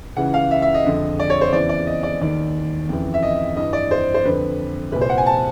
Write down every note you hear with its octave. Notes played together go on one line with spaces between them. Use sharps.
C#2 C#3 E3 F#5
F5
E5
E5
D#5
F2 D3
D5
C#5
C5
E2 C#3 E3 D5
D5
D#5
D5
D#2 D#3 D5
F2 C#3 E3
E5
D#5
G2 E3 D#5
D5
C5
C5
F2 D3 B4
C2 A#2 B4
C5
F#5
G#5
A5